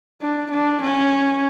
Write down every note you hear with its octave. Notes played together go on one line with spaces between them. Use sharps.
D4
D4
C#4